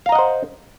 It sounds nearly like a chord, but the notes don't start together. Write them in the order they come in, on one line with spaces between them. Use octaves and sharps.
F5 A#5 D#5 F#5 C5